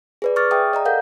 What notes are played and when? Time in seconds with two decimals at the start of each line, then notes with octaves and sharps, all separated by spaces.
0.22 G#4 B4 D5
0.36 C#6 D6 F6 A6
0.51 G#4 E5 G5 A5 D#6
0.73 D5 D#5 A#5
0.85 A4 A#4 F5 F#5 G6